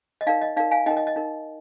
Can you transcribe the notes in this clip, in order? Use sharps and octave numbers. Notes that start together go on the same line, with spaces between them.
D#5
D#4 A#4 D5 F5
D#5
D#4 A#4 D5 F5
F5 G#5
D#4 A#4 D#5 G5
D#5
D#5
D#4 A#4